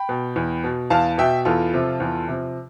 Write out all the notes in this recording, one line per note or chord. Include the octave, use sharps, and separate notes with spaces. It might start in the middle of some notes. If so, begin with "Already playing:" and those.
Already playing: G5 B5
B2
E2
B2
E2 F5 A5
B2 E5 G5
E2 F4 A4
C3 F3
E2
C3 F3